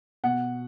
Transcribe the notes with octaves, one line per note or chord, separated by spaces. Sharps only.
B2 F#5